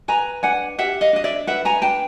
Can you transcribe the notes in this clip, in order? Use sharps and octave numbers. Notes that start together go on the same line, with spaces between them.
B4 G#5 A#5
D4 F#5 G#5
G4 E5 F#5
D#5 F5
D4 D#5
D5 E5
B4 E5 F#5
G#5 A#5
D4 G5 A5